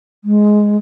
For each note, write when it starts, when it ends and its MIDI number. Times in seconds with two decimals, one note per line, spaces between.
0.24 0.77 56